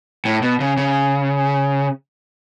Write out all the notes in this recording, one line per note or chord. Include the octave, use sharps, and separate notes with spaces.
A2
B2
C#3
C#3